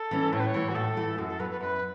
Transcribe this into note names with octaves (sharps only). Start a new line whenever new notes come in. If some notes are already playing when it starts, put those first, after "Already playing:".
Already playing: A4
E3 C#4
A2 C#5
B4
C#5
E3 A3
F#4
A2 A4
E3 A3
F#2 F#4
A4
F#3 B3 B4
B4
F#2 B4